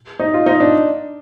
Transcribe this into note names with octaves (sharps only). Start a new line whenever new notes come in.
D#4
F4
D#4
D4